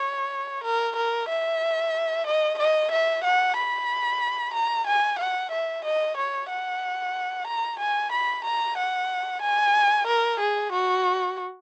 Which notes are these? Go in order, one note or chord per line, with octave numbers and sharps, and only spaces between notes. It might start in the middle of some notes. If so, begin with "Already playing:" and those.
Already playing: C#5
A#4
A#4
E5
D#5
D#5
E5
F#5
B5
A#5
G#5
F#5
E5
D#5
C#5
F#5
A#5
G#5
B5
A#5
F#5
G#5
A#4
G#4
F#4